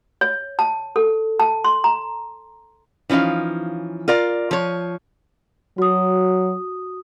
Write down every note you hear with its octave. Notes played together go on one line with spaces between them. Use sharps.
C#5
A5
A4
A5
C6
A#5
E3 F3 C#4 D#4 F5
F4 A#4 D5 F5
F3 C#5
F#3 F#4 D#6